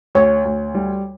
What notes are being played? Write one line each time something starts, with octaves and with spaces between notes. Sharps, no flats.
D2 C#5
D2
G3